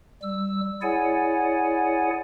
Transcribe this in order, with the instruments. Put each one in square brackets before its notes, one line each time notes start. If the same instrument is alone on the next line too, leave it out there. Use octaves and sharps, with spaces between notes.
[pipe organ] G3 E6
E4 G#4 C#5 D5 F#5 G#5